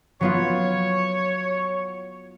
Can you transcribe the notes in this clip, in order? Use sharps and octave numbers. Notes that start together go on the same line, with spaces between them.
F#3 B3 F4 C#5